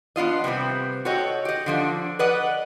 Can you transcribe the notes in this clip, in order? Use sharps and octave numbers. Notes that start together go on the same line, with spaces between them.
B3 D4 F4 D#5
C3 G3 B3 C4
F#4 A4 C#5 D#5 G5
G4 D#5
D3 F3 D4
B4 D5 D#5 F#5